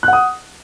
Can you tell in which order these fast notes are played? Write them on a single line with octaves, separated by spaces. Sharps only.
F#6 F#5 D#6